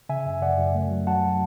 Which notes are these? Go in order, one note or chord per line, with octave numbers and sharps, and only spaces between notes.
C#3 E5 G#5
F#2
F#2 D5 F#5
F#2
A3
F#3
F#3 F#5 A5